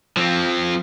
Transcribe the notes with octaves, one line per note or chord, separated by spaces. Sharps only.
F3 C4